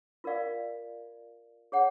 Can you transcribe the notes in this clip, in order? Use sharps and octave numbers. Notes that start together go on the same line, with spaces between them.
F4 A#4 D5 F5
G#4 C#5 F#5